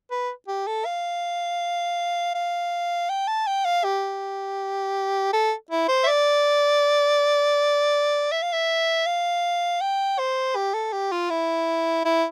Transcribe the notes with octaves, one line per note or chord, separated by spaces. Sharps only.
B4
G4
A4
F5
F5
G5
A5
G5
F5
G4
A4
E4
C5
E5
D5
E5
F5
E5
F5
G5
C5
G4
A4
G4
F4
E4
E4